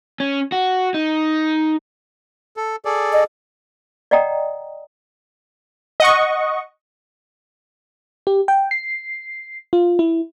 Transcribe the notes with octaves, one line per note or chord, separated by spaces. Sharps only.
C#4
F#4
D#4
A4
G#4 A4 D5
D#5
D5 D#5 F#5 G5 A#5 D#6
D#5 F#5 C#6
G4
G5
C7
F4
E4